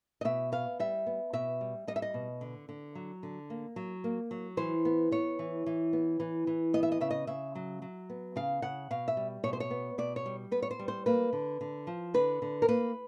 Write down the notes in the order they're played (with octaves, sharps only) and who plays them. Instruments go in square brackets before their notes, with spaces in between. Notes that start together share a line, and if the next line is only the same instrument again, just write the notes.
[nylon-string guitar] D#5
B2 E5
B3 F5
G3 E5
B3
B2 E5
G3
G3 D#5
E5
D#5
B2
D3
D3
F#3
D3
A#3
F#3
A#3
F#3
E3 C5
B3
B3 C#5
E3
E3
B3
E3
E3
B3 D#5
E5
D#5
C#3 E5
D#5
C#3 E5
F#3
F#3
B3
C#3 F5
C#3 F#5
B2 F5
E5
G3
B2 C#5
C5
C#5
B3
B2 D5
C#5
G3
B3 B4
C#5
C5
G3
C5
A#3 B4
D3
D3
F3
D3 B4
D3
A#4
A#3 B4